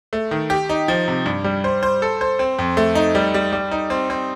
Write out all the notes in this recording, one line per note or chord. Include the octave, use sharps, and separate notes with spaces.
A3
D#3
G4
D#4
F3
C3
G2
G3
C5
C5
A4
C5
C4
F2
A3
D#4
G3
G3
G3
D#4
C4
C4